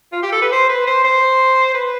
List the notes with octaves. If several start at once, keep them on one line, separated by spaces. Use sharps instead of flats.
F4
G4
A4
B4
C5
B4
C5
C5
B4